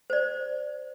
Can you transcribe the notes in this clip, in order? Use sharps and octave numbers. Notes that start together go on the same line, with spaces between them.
C5 D5